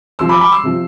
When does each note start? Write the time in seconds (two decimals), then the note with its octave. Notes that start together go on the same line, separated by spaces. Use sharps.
0.19 C3 F3 C6 E6
0.29 B5 D6
0.40 B5 D6
0.52 C6 E6
0.63 C3 F3